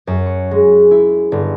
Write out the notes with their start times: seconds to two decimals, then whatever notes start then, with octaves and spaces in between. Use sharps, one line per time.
0.07 F#2
0.26 C#6
0.51 G#3
0.91 E4
1.32 G1